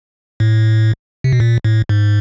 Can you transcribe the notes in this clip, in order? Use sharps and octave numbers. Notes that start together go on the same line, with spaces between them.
A2
C3
B2
A#2
A2
G#2